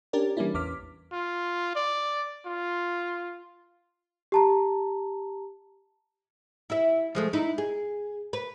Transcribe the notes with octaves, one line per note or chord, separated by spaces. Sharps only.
C#4 D4 G4 A#4 D5
E3 G3 A#3 C#4 D4 E4
A1 E2 C#4 D6 F6 B6
F4
D5
F4
G4 A5 A#5
E4 E5
F3 G#3 A3
D#4 E4
G#4
B4